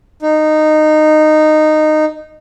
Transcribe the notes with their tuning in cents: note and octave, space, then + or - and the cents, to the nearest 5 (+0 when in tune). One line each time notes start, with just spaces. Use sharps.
D#4 -15